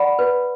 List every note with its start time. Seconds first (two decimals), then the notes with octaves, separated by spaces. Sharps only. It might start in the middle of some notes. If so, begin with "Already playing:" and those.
Already playing: D5 F#5 B5
0.19 B4